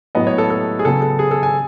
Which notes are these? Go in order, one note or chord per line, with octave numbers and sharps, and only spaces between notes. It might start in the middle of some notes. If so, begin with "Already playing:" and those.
A2 F#3 B3 D#5
C#5
A4
A4
G#4
C#3 F#3 B3 A4
A4
G#4
A4
G#5